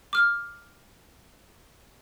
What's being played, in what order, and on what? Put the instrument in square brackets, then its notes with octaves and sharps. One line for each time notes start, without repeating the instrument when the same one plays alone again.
[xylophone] D6 F6